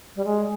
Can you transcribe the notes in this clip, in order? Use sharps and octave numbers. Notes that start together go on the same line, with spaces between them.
G3
G#3